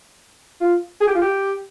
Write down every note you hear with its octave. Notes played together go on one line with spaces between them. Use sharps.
F4
G#4
G4
F4
G4